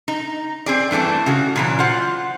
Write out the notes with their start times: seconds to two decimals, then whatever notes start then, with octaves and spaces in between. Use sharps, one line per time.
0.08 D#4
0.66 C4 G#4 D5
0.91 G2 E3 A3 C4 D4
1.26 C#3 F#4 G#4
1.56 A#2 E3 F#3
1.79 F4 C5 F#5